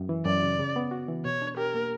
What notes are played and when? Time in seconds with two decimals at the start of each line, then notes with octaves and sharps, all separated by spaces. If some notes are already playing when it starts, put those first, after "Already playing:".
Already playing: F#2
0.09 E3
0.26 F#2 D5
0.43 C#3
0.59 C#3
0.76 B3
0.91 F#4
1.08 E3
1.25 B2 C#5
1.42 D4
1.57 G4 A#4
1.74 A#3